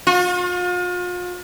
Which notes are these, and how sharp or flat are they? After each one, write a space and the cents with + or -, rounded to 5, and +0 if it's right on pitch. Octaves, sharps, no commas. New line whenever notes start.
F4 +40